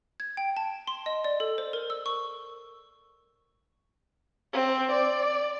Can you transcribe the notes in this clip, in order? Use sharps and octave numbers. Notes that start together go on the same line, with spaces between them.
G#6
G5
A5
C6
D#5
D5
A4
C5
A#4
E6
C#6
C4
D5